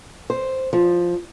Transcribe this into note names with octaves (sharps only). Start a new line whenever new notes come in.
C5
F3